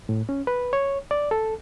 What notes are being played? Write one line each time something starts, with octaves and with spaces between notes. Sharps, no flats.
A2
C#4
B4
C#5
D5
A4